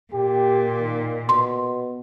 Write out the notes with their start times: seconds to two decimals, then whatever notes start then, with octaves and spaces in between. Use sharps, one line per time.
0.13 A#2 G4
0.79 D#3
1.29 B2 C6